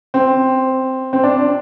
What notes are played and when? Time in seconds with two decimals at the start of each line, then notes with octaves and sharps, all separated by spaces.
0.14 C4
1.13 C4
1.24 D4